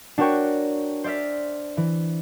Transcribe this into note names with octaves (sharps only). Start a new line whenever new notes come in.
D4 F#4 A#4 C#5 G5 C#6
C5 D5 E5 F6 B6
E3